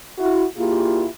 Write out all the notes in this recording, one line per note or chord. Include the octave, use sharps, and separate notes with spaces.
E4 F#4
A#2 A#3 E4 F4 G4 G#4